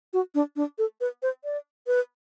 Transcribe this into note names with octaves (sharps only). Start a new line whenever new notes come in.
F#4
D4
D4
A4
B4
C5
D5
B4